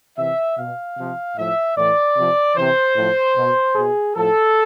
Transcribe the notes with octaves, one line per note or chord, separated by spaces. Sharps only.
C3 E3 E5
B2 F5
C3 F3
A2 F3 E5
A2 E3 D5
C3 F3
C3 E3 C5
A2 F3
B2
B2 G#4
A2 F3 A4